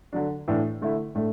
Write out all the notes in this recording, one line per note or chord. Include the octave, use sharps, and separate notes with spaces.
D3 F#3 D4
A2 E3 D4
D3 A3 E4
A2 A3 D4